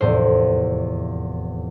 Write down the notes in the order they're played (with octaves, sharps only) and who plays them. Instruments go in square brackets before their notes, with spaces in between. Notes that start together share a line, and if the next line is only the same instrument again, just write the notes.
[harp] F1 E2 A2 C5